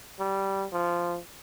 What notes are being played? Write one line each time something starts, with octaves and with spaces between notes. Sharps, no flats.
G3
F3